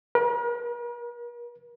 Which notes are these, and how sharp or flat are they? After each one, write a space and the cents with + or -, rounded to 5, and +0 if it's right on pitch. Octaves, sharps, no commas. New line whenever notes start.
A#4 +45